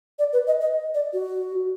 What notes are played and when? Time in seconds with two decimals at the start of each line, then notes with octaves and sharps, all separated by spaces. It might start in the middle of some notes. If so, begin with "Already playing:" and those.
0.19 D5
0.33 B4
0.47 D#5
0.61 D#5
0.94 D5
1.13 F#4